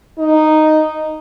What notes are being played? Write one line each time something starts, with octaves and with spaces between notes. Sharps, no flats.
D#4